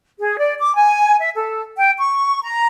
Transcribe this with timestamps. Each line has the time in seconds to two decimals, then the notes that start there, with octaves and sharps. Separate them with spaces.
0.19 G#4
0.37 D5
0.59 D6
0.75 G#5
1.19 E5
1.35 A4
1.77 G5
1.98 C#6
2.42 A#5